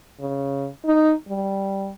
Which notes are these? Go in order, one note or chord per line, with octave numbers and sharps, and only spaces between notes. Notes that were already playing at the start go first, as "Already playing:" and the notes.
C#3
D#4
G3